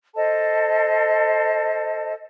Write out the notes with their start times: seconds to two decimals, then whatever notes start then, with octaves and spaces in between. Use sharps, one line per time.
0.15 A4 C5 D#5 A5